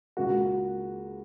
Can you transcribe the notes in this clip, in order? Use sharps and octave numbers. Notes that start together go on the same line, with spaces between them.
C#2 C#3 A#3 F#4